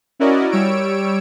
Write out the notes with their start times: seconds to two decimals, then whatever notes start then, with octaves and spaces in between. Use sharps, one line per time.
0.20 C#4 E4 F#4 A#4 D5 D#5
0.51 G3 C#5 E6 D7